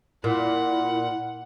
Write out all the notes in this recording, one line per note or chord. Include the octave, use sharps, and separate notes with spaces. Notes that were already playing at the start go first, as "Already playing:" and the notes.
A#2 E4 F#5